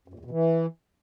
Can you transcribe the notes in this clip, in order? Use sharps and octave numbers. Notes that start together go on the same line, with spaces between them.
F#2
A#2
E2
B2
E3